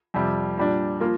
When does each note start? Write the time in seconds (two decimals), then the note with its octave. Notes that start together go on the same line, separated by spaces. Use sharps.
0.14 F2 C3 G3
0.58 A#2 G3 D4
1.00 F3 A#3 F4 A#4